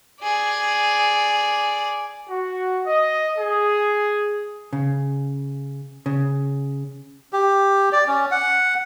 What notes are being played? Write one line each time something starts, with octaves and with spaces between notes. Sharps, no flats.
G#4 D5
F#4
D#5
G#4
C#3
C#3
G4
D5
C#4
F#5